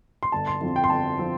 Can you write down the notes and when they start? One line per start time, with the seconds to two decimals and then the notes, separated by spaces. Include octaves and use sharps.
0.23 C6
0.32 G1 A5
0.47 C6
0.61 F2 F3 C4
0.76 G5
0.84 C6
0.90 G1 A5
1.19 F3 C4